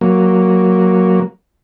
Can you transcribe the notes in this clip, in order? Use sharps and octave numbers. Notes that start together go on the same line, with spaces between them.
F#3 A#3